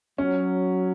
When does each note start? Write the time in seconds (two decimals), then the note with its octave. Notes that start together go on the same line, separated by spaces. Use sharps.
0.18 F#3 C#4